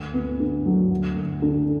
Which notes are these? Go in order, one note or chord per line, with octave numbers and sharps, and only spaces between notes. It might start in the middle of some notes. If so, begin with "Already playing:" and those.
Already playing: D2
B3
D3
F#3
D2
D2
D3